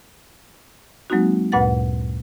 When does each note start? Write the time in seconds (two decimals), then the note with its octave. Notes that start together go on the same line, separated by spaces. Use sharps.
1.10 F#3 G#3 A#3 C4 D#4 F#4
1.52 D2 G2 A#2 B4 F#5 A6